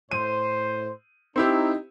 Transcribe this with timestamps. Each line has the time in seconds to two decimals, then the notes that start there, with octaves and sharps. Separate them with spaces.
0.11 A2 C5 D#7
1.36 C4 D#4 E4 G4